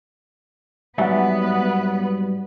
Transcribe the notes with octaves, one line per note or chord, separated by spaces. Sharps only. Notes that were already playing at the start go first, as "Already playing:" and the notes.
G#2 F#3 G3 B3 B4 E5 F#5